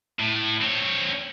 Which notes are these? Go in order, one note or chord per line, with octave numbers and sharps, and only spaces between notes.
A2
C4 C#5